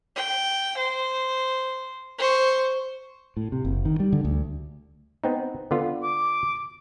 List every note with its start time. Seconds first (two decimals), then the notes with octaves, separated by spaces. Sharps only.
0.16 G5
0.77 C5
2.18 C5 C#6
3.37 A2
3.52 C3
3.65 F#1
3.85 D#3
4.00 G3
4.13 D3
4.25 D2
5.24 B3 C4 D#4
5.71 D3 B3 F4
6.03 D6